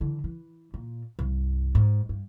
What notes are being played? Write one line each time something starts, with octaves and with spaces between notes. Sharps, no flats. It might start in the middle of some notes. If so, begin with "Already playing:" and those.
D3 E3
E3
A#2
C2 G2
G#2
G2